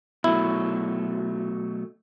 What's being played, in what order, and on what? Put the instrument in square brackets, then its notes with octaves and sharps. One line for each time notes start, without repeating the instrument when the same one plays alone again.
[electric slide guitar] B2 F#3 A3 [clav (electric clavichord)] E4